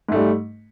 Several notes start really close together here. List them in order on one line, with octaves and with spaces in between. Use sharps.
G#2 A3 G3